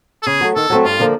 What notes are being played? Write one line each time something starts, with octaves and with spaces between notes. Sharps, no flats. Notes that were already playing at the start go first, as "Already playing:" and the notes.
A4
C#3 G#4
F#3 A3
D#3 A4
F#3 A3 C4
G2 F4
D3 F3 A#3